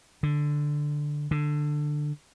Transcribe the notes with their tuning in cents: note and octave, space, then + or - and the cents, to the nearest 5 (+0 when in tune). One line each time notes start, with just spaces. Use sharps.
D3 +5
D3 +15